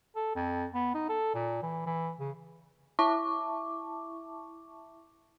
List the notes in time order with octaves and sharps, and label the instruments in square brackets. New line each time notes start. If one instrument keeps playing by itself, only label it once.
[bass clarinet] A4
F2
B3
D#4
A4
A#2
E3
E3
C#3
[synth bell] E4 E5 A5 C#6 D6